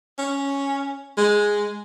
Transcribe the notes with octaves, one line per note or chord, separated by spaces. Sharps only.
C#4
G#3